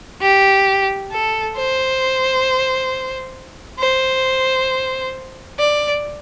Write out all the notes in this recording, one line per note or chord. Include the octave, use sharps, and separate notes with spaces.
G4
A4
C5
C5
D5